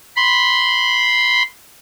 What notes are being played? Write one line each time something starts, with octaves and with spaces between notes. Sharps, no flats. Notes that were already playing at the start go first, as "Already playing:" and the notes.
B5 C6